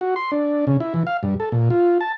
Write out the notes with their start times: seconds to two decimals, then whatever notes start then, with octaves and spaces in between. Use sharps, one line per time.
0.01 F#4
0.16 C6
0.32 D4
0.67 C#3
0.80 E4
0.94 E3
1.07 F5
1.23 G2
1.40 A4
1.52 A#2
1.70 F4
2.01 A5